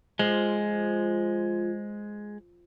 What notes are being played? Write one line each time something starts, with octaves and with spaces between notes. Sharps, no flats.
F3 G#3